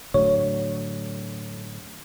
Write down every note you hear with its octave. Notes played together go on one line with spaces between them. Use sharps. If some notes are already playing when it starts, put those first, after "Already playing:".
A2 D3 F#3 C#5